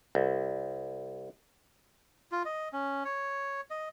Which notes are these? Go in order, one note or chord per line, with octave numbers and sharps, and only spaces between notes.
C2
F4
D#5
C#4
C#5
D#5